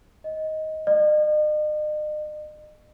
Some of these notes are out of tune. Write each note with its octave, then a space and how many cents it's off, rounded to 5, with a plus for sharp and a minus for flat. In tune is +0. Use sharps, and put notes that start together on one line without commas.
D#5 +10
D#5 -45